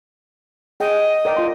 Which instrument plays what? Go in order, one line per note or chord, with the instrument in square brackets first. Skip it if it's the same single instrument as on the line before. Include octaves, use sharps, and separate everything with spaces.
[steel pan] G#4 G5 [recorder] D#5
[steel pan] A#4 D5 G5
F4 C6